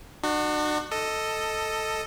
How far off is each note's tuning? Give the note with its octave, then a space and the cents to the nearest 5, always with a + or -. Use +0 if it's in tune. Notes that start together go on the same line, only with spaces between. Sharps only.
D4 +45 F#4 +0
A4 +5 D#5 +0